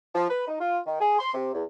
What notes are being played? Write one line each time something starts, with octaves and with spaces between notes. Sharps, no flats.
F3
B4
D#4
F4
D#3
G#4
C6
C3
E2